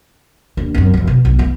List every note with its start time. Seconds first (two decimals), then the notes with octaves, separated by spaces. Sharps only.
0.57 D#2 D4
0.74 F#2 C4
0.94 F#1 F3
1.07 B2
1.25 B1
1.39 B3 E4